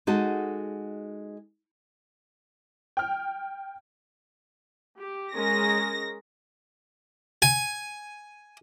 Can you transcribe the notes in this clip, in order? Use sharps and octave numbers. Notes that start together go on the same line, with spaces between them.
G#3 D#4 F#4 A4
G5 F6
G4
G#3 C#4 A#4 A#6
G#5